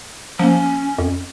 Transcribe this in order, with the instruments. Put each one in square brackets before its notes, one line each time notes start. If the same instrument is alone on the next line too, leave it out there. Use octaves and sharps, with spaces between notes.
[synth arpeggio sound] F3 A#3 [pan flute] C#4
[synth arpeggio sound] F2